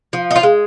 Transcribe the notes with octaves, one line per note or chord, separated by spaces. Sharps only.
F3
D#4
F4
G#3